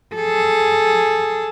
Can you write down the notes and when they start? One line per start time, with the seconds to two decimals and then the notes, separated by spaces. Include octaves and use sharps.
0.15 G#4 A4